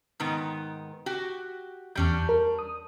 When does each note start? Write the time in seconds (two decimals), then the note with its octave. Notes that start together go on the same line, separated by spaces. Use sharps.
0.20 G#2 D#3 B3
1.06 F#4 G4
1.95 E2 G3 C#4 D4 G6
2.29 A#4
2.59 D#6